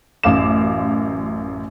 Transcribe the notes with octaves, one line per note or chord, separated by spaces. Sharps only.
A1 F#2 F5 D6 E7